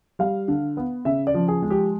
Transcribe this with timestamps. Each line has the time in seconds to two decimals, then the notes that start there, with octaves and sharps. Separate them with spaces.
0.19 G3 F5
0.48 D3
0.77 B3
1.05 C#3 E5
1.27 D5
1.34 F3
1.48 G#4
1.62 G#3
1.70 G4